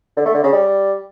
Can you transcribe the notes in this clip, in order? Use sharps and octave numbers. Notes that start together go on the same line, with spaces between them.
D3
A3
D3
C#3
G3